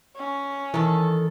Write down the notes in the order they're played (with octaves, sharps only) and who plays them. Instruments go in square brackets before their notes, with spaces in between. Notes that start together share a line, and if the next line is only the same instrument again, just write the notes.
[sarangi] C#4
[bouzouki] D#3 A4 [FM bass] E3